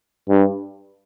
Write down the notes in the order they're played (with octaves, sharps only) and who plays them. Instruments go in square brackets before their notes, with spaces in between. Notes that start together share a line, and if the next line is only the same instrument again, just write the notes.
[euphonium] G2